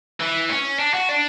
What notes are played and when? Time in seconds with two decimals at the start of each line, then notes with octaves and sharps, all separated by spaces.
0.20 E3
0.49 C#4
0.79 D4
0.94 F#4
1.09 D4